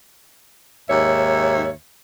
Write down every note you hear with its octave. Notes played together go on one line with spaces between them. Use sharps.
D#2 G#2 C#5 E5